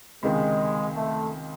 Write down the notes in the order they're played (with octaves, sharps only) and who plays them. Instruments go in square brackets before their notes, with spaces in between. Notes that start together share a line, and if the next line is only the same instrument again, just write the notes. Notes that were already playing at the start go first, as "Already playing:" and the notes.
[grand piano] C#2 C3 D#3 [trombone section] G#3
[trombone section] A3